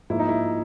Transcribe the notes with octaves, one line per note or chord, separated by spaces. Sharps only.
G#2 F3 A#3 E4
D#4
E4